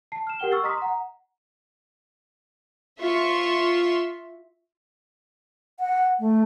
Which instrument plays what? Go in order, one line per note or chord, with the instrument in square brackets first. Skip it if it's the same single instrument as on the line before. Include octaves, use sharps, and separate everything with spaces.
[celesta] A5 C7
F6 E7
G4 A#4 F#5 G5 G7
C#6 E6 F6 A6 C7
D#5 A#5 C6 D#6 B6
F#5 A#5
[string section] F4 E5 C6 C#6
[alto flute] F#5
A3